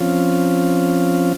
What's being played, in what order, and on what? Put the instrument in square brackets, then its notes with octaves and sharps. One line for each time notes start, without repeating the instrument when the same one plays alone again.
[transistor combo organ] F3 C4 C#4 F4